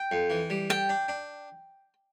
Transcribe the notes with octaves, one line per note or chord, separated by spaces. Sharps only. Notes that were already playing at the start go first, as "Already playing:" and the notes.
Already playing: G5
F2
E3
G3
A4 G5
D4
D4